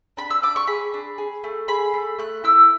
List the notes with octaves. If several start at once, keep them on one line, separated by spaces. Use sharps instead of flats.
D4 B5
E6
D4 D6
C#6
G#4 B5
D4
G#4
A3
G#4 B5
A3
A3 F#6
E4 E6